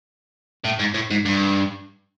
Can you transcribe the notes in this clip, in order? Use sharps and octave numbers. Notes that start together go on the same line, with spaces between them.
A2
G#2
A2
G#2
G2